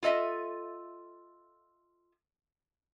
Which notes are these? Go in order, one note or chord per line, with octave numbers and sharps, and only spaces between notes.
F4 A4 D#5 E5